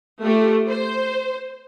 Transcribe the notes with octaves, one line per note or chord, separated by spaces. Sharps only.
A3 F4 G4
C5